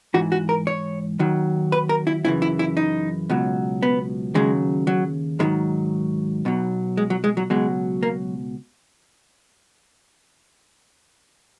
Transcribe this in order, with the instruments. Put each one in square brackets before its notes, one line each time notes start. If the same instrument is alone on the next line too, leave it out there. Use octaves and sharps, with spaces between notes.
[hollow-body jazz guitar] G#2 E3 F#4
F#4
A#4
C#5
D#2 D#3 F#3
B4
A#4
E4
F#2 C#3 E3 E4
E4
E4
D#4
C#2 B2 F#3
B3
D#2 C#3 F#3 G#3
F#3
G#2 D#3 F#3 G#3
B1 B2 F#3
G#3
F#3
G#3
F#3
C#2 B2 F#3 G#3
A#3